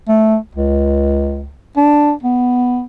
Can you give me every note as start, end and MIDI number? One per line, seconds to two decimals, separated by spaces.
0.08 0.37 57
0.55 1.51 37
1.77 2.12 62
2.23 2.83 59